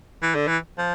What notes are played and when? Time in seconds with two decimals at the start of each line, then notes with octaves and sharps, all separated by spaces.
0.22 E3
0.35 D3
0.48 E3
0.78 F3